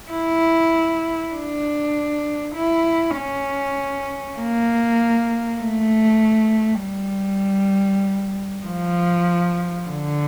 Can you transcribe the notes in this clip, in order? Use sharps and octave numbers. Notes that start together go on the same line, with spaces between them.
E4
D4
E4
C#4
A#3
A3
G3
F3
D3